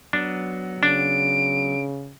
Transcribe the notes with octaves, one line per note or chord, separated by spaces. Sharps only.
F#3 B3 D4
C#3 D4 D7